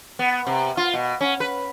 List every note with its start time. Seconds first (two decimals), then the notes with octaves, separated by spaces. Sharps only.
0.19 B3
0.47 C3
0.77 F4
0.94 B2
1.21 C#4
1.40 B4